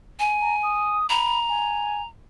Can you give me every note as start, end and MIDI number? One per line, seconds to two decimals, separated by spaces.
0.19 0.98 80
0.41 0.55 82
0.63 1.07 87
1.10 2.07 82
1.10 1.39 83
1.49 2.01 80